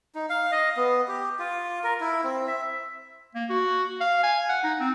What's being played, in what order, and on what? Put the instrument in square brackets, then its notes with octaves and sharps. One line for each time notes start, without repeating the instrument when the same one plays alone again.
[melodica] D#4
F5
D#5
B3
G4
F4
A#4
E4
C4
E5
[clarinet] A#3
F#4
F5
G#5
F#5
D#4
C4